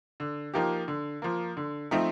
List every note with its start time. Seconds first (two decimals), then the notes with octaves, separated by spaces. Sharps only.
0.20 D3
0.54 F3 A#3 D#4 G4
0.88 D3
1.22 F3 A#3
1.57 D3
1.91 F3 A3 C4 D#4